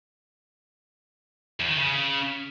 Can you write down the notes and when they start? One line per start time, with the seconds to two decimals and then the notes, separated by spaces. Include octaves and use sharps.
1.60 E2
1.69 D#3
1.78 C#3